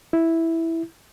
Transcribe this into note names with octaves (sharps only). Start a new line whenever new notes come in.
E4